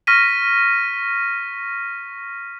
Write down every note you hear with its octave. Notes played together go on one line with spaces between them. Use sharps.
C#6 F6 A#6 B6 D#7